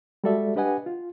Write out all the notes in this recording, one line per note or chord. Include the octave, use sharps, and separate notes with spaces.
G3 G#3 F#4 A4 D5 E5
D4 G4 B4 D#5 F#5 G#5
F4